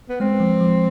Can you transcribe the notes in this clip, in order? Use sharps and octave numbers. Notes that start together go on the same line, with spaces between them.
B3
G#3 C4
F3
F3